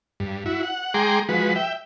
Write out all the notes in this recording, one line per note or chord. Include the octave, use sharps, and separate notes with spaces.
G2
E4 F#4
F#5
G#3 G#4 G5 A#5 C6 D6
F3 G#3 F#4 B4
E5 G5